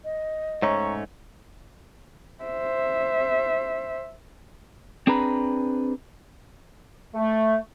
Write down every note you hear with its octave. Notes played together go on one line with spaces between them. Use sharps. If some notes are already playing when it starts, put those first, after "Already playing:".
D#5
G#2 A3 C#4 C#5 A#5 C#6
C5 E5
C4 D4 G#4 B4 A#5 B5
A3